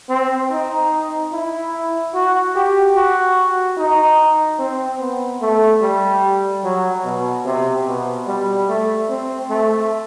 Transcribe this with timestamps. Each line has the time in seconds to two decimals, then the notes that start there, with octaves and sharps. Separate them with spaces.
0.09 C4
0.51 D#4
1.32 E4
2.14 F#4
2.55 G4
2.95 F#4
3.77 D#4
4.59 C4
5.00 B3
5.41 A3
5.82 G3
6.64 F#3
7.04 B2
7.45 C3
7.86 B2
8.27 G3
8.68 A3
9.09 C4
9.49 A3